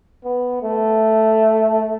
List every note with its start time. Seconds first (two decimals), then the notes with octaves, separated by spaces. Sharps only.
0.25 B3
0.63 A3